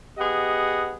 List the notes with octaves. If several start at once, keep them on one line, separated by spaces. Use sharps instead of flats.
B3 G4 G#4 D#5 F#5